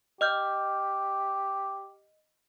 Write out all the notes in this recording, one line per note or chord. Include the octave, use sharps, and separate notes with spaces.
G4 D#5 F6 G6